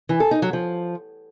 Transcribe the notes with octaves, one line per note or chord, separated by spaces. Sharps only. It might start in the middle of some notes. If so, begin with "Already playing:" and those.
E3
A4
D#4
F#3
F3